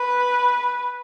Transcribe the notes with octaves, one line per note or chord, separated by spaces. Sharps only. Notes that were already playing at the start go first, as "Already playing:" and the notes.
Already playing: B4